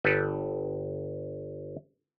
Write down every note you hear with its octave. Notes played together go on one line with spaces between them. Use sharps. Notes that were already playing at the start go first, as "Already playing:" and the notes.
G1 G4 A4 B4